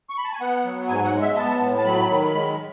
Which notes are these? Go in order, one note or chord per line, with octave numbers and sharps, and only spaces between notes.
C#6
B5
A5
G#5
B3 F#5
F#3
G#2 G#5
F#5
G#3
E5
B3 A5
A2
A5
F#3 B5
D#3
G#3